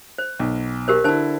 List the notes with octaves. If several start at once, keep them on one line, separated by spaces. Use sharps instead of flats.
C5
B1
G4 A#4 C5
D3 E4 C5 A5